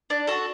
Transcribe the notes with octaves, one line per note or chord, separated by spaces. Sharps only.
D4
F#4 A4